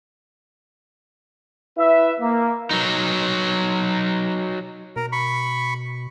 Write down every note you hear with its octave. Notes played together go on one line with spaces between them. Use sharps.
E4 B4 E5
A#3
F#3 D#4
B2 A#4
B5 C#6